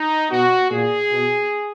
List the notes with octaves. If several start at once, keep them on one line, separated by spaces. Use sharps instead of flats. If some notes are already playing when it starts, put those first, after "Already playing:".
Already playing: D#4
B2 F#4
A#2 G#4
B2